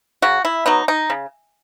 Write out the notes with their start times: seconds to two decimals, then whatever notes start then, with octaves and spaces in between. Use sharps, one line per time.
0.22 C#3 F#4
0.45 E4
0.66 F#3 B3 D#4
0.88 D#4
1.10 C#3